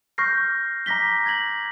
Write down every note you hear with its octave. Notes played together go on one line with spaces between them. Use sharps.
C#6 F6 G6 A#6 C7
A#5 D6 A#6 B6 G7
G#6 A#6 F#7